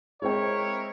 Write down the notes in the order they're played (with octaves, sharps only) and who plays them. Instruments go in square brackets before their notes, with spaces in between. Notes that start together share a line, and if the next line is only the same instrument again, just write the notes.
[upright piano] G#3 C4 G5 [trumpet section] E4 A#4 C#5